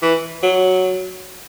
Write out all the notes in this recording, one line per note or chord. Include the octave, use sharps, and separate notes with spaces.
E3
F#3